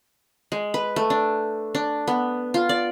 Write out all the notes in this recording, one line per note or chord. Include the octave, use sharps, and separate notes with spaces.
G#3
B4
A3
D4
D4
B3
F4
D5